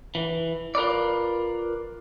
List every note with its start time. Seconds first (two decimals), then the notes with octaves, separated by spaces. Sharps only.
0.15 E3
0.75 F4 A#4 B4 D5